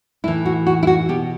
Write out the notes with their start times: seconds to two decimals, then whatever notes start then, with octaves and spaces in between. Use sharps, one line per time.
0.24 A2 E3 E4
0.46 F#4
0.67 F#4
0.83 E4
0.87 F#4
1.09 B2 G4